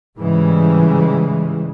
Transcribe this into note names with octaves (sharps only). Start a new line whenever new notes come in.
G#2 C#3 E3 G3 G#3